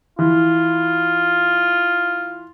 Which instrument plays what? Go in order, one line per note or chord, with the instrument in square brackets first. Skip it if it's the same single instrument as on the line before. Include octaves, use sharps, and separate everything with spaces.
[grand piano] E3 [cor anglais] F4